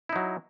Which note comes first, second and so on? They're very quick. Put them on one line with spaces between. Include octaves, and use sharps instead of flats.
E4 D#4 F#3